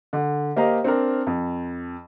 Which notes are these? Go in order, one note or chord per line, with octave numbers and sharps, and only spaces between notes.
D3
A#3 G4 C5 D#5 F5 A#5
C4 D4 A#4
F2